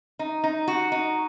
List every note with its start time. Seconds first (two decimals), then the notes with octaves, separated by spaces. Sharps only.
0.19 D#4
0.44 D#4
0.68 F#4
0.92 D#4